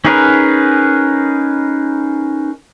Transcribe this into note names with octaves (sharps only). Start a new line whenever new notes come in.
C#4 D#4 G#4 A#4 B4